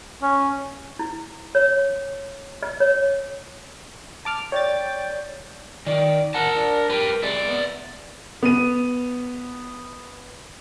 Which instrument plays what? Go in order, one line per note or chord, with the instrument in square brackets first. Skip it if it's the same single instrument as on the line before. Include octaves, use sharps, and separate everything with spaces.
[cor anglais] C#4
[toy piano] E4
C#5
D#5
C#5
[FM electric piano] A5 D6 F6
[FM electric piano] C#5 D5 A6 [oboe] G5
[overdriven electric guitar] D#3 [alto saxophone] D5
[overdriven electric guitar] A#4 A5 [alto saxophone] F#5
[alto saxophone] D4
[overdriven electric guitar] G4 B4 [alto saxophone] A#4
[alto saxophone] G#3 [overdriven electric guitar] E4 D5
[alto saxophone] B3
[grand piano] B3 D#7